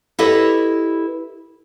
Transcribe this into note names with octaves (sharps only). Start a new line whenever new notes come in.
E4 G4 A4 B4 C#5 D#5